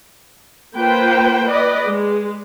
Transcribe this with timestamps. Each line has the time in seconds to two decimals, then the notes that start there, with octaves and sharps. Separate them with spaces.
0.75 A#3 F4 B4 C5 G5
1.47 B4 D5 D#5
1.85 G#3